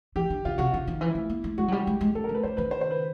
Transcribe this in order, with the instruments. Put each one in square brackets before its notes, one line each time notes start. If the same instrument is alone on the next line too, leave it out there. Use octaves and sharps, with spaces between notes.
[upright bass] E3 [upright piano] G4
[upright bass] D3
[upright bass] C#3 [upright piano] F4
[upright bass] C3 [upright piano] F#4
[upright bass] C#3 [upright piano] F4
[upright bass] D#3
[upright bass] E3 [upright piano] E4
[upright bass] A3
A#3
A3
[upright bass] G#3 [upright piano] F#4
[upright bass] F#3
[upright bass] G3 [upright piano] G4
[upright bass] G#3
G#3
[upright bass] A3 [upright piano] A4
[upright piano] A#4
[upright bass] A3
[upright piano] B4
[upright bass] A3 [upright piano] C5
[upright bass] D#3 [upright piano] B4
[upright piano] C5
C5
B4